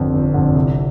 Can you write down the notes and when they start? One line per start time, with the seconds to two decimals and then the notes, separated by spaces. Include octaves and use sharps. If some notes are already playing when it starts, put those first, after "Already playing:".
Already playing: G1 F2 D3
0.13 G1
0.34 F2 D3
0.55 C2